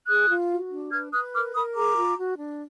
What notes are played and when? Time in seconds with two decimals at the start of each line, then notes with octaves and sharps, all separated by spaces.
0.08 G#4 D#6 F#6
0.29 F4
0.50 F#4
0.70 D4
0.91 B4 F6 G#6
1.12 B4 D#6 F#6
1.33 A#4 D6 F6
1.55 A#4 B5 D#6
1.76 G#4 A#5 D6
1.97 F4
2.17 F#4
2.39 D4